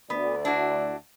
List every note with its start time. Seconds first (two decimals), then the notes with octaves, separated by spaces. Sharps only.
0.10 D2 B3 D5
0.45 D4 E4 F#4